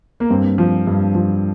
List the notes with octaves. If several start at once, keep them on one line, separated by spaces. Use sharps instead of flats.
A#3
G2 C4
F3
G2
F3